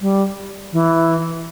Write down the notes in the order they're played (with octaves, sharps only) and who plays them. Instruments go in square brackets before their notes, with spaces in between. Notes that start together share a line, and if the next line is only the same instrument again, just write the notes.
[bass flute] G3
E3